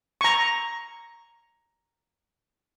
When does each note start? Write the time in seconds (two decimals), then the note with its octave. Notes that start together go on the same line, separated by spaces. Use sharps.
0.21 A#5 C#6